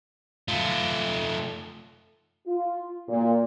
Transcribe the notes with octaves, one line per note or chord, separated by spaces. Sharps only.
A3 F4
F4
A#2